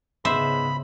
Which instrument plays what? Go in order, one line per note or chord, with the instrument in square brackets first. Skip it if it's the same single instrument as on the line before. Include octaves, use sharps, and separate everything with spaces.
[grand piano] G#2 G#3 B3 [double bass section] C#3 [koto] C5 E5 [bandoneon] B5